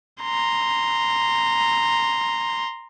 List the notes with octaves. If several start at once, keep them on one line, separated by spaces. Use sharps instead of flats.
A#5 C6